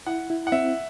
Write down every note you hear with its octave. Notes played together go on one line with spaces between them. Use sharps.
E4 F#5
E4
F#5
C4 E5